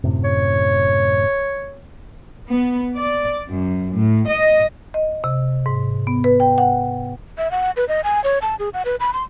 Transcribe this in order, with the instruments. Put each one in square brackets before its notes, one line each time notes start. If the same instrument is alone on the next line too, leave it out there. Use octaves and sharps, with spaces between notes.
[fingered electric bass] F#2 A2 C3
[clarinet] C#5
[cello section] B3
D5
F#2
A2
D#5
[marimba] D#5
C3
G#2
B3
B4
G5
F#5
[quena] E5
F#5
B4
D#5
G#5
C#5
A5
G#4
F#5
B4
B5
C6